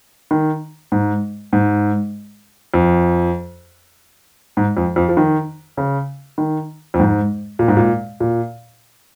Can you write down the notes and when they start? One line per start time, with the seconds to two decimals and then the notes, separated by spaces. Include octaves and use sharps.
0.31 D#3
0.92 G#2
1.53 G#2
2.74 F2
4.57 G#2
4.77 F2
4.96 F2
5.09 F3
5.17 D#3
5.77 C#3
6.38 D#3
6.94 F2
6.99 G#2
7.59 A#2
7.68 G#2
7.77 A#2
8.20 A#2